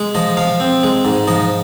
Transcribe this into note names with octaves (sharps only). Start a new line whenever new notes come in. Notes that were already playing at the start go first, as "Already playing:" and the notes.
Already playing: G#3
F3 D#5
F3 F5
C4
G#3
G#2
F3 D#5